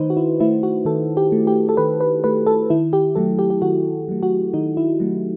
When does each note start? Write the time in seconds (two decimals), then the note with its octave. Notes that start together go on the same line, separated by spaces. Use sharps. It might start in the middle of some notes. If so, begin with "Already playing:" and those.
Already playing: D#3 A3 D#4 B4 C5
0.10 F#4
0.17 E4
0.40 A3 E4
0.63 F#4
0.85 D#3 A4
1.17 G4
1.32 A3
1.47 G4
1.69 A4
1.77 D#3 B4
2.00 B4
2.24 A3 B4
2.46 A4
2.70 D#3 E4
2.93 G4
3.15 F#3 A3 A4
3.39 G4
3.50 G4
3.62 D#3 F#4
4.08 F#3 A3
4.23 F#4
4.54 D#3 D#4
4.77 E4
5.00 F#3 A3